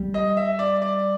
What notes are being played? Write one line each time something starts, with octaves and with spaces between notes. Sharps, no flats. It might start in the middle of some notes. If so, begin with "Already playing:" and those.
Already playing: G3
D#5
E5
D5
D5